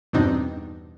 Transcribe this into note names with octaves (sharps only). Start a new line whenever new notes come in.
E2 G2 B2 C4 D4 D#4